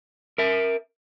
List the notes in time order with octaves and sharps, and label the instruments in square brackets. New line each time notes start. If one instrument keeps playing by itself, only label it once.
[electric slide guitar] A#4 E5